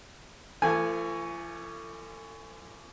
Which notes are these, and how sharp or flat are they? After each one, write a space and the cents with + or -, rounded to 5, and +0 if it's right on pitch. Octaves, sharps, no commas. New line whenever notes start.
F3 -40 A3 +30 G#5 -10